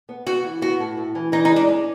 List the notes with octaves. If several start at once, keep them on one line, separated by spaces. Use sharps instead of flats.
B3
B3 F#4
E3
B3 F#4
A2
A2
E3
E3 D#4
D#4
G#3
D4
C#4